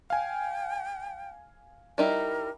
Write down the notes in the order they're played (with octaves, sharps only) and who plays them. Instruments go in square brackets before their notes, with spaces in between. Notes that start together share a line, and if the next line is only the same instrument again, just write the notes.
[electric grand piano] F5 G#5 [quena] G5
[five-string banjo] G3 D#4 E4 [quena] A#4